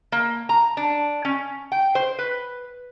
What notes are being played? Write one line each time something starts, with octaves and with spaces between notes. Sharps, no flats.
A#3
A#5
D4
C#4
G5
C5
B4